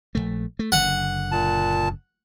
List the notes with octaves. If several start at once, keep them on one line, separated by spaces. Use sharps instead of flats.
A#1 D#2 A3
A3
F#1 D3 F#5
A#2 A5